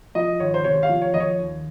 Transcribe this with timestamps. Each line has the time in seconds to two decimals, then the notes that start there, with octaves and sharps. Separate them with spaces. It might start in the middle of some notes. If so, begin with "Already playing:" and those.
0.15 F3 D#5
0.40 G#1 C#5
0.54 C5
0.64 C3 C#5
0.83 F5
0.89 F3
1.02 C#5
1.14 F2 D#5
1.20 C#5
1.39 D#2